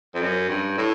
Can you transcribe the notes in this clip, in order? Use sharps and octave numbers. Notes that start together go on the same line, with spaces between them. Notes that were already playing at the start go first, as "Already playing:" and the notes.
F2
F#2
G2
A2